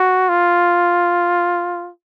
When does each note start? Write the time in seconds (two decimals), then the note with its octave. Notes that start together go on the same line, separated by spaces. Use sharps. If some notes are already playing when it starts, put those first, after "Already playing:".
Already playing: F#4
0.29 F4